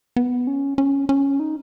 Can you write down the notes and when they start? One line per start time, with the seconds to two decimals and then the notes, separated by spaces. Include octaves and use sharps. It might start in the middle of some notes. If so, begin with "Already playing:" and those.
0.16 B3
0.47 C#4
0.78 C#4
1.09 C#4
1.40 D#4